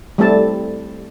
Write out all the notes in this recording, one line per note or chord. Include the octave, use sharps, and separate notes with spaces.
G3 A3 C4 E4 A4 A5